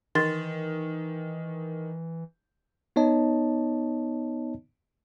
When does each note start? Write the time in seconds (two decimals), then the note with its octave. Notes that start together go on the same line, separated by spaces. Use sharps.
0.15 D#3 E3 C6 A6
2.96 B3 D#4 C#5 D#5 A5